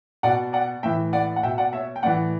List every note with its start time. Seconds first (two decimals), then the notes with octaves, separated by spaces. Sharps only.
0.23 B2 D5 F#5
0.53 D5 F#5
0.83 A2 E3 E5 G5
1.13 D5 F#5
1.36 F#5
1.43 B2 E5 G5
1.58 D5 F#5
1.73 C#5 E5
1.96 G5
2.03 A2 E3 D5 F#5